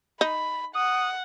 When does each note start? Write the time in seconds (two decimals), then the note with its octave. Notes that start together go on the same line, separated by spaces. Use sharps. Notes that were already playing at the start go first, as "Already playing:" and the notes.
0.21 D#4 B5
0.75 F#5 D#6